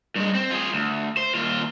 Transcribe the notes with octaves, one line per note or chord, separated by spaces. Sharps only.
G2 G#3
C4
F4 G#4
D2
C5
D#2 F4